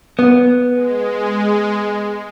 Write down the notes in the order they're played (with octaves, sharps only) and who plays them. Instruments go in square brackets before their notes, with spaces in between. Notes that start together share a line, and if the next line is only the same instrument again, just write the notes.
[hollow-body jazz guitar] B3
[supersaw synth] G#3